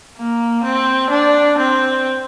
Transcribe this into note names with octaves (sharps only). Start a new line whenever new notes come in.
A#3
C4
D4
C4